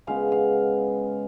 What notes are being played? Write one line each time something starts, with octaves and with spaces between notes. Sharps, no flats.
C#3 G#3 B3 F5
F5